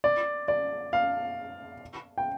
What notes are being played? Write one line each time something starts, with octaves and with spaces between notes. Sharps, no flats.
D5
D5
F5
G5